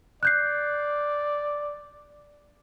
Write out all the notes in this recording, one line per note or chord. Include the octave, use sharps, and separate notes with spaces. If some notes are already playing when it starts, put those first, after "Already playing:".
D5 F#6 G6 C7